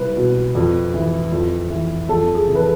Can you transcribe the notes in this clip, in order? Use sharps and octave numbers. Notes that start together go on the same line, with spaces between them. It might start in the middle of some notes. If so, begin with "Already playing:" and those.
Already playing: C2 B4
B2
F2
E3
F2
E3
F2 A4
G#4
C3 E3
B4
A4